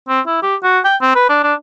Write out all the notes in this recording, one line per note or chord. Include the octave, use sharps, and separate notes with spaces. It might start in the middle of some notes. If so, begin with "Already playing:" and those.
C4
E4
G4
F#4
G5
C4
B4
D4
D4